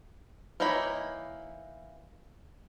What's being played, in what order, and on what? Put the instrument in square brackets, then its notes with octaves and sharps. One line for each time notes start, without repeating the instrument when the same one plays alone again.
[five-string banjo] E3 A#3 D#4 C#5 B5